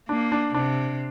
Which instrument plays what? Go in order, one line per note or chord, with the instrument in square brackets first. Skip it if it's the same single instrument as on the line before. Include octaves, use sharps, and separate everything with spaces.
[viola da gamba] A#3 [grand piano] D4
[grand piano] D4
[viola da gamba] C3 [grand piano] D4